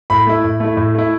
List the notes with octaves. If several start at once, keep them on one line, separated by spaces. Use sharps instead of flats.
A2 B5
A3 E4
A2
A3 E4
A2
A3 E4